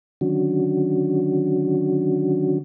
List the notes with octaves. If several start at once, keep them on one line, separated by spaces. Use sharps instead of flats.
D3 D#3 F#3 C#4 D4 F#4